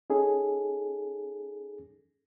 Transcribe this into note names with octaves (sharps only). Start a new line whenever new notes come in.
C#4 D#4 G#4 A4